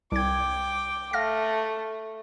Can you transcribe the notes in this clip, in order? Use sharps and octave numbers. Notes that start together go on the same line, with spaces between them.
C2 G5 D6 G#6
A3 F5 F6 A#6